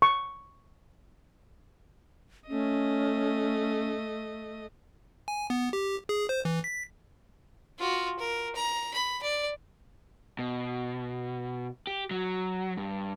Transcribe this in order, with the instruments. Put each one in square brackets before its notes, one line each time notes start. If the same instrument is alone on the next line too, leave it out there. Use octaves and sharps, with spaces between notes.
[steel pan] C#6
[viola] A3 D#5 [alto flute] C#4
[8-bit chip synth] G#5
B3
G4
G#4
C5
E3
B6
[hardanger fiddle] F4 F#4
A#4
A#5
B5
D5
[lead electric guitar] B2
G4
F#3
G2